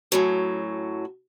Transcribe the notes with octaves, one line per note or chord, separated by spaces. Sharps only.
F#2 A2 F#3